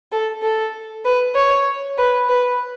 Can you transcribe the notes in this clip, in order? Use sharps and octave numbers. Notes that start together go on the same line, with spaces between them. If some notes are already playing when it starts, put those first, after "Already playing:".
A4
A4
B4
C#5
B4
B4